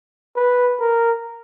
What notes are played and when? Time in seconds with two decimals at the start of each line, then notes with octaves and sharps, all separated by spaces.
0.36 B4
0.80 A#4